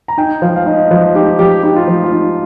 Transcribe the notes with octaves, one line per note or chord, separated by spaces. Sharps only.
A#5
D#4 G5
F3 F5
F5
D#4 D#5
F3
D#4 G4
F3 G4
D#4 G4
F4
F3
F4
D#4